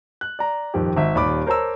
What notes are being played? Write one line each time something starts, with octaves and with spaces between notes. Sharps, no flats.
F#6
D5 A#5
D#1 F2 D#3 G4
G#1 E5
D#1 D#2 D5 B5 D6
A#4 C5 C#5 A5 A#5 E6